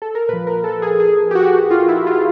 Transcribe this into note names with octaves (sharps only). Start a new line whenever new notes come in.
A4
A#4
A#2 F3 B4
A#4
A4
G#4
G#4
G4
F#4
F4
E4
F4